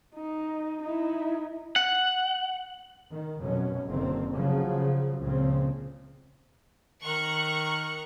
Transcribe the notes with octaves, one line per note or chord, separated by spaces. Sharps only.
D#4
D#4 E4
F#5
D#3
F1 F#2 B2 F#3 C#4
F#1 D3 D#3 C4
C#3 F3 F#3
C#2 A#2 C#3 F3 C4
D#3 A#5 C#6 F#6